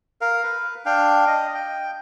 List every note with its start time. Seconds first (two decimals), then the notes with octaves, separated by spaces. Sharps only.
0.21 A#4 F5
0.43 B4
0.86 D4 F5 G5
1.27 D#5
1.55 G5